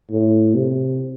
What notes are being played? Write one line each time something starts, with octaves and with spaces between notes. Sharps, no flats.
A2
C3